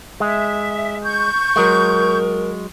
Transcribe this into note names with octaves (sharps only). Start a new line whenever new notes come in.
G#3 E5
C#6 G6
F#3 G#3 A#4